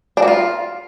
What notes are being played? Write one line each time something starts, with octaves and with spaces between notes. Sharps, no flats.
D4
F#4
F4